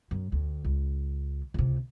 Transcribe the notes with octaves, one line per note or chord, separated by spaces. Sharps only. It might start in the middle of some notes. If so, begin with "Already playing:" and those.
F#2
D2
C#2
C#2 C3